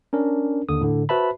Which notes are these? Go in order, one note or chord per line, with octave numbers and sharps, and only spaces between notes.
C#4 D4 A#4
D#2 D3 D#6
A2 D3
F#4 B4 C5 E5 A5 B5